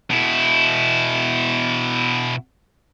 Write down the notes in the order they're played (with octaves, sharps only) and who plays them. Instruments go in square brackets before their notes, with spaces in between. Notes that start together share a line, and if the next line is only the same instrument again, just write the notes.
[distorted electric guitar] B2 E4